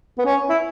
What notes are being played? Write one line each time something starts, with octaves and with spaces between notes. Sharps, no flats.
B3
C#4
E4